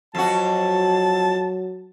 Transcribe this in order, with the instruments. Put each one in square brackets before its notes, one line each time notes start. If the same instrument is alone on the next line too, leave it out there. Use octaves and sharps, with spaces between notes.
[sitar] F2 F#4 [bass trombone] F#3 [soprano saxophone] A5